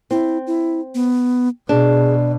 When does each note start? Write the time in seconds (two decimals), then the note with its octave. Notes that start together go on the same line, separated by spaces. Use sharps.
0.11 C4 E4
0.47 E4
0.95 B3
1.69 B2 D4 G#4